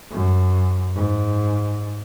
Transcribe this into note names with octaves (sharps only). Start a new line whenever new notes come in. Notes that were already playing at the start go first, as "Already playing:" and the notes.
F#2
G#2